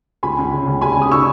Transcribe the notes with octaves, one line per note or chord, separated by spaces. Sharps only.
C#2 G#5 B5
C#2
C#3
C#2
C#2 G#5 B5
C#2
D#6
C#6 E6